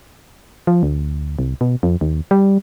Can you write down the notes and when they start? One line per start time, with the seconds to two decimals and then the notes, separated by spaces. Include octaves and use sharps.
0.67 F3
0.83 D2
1.39 C2
1.61 B2
1.83 F2
2.01 D#2
2.31 G3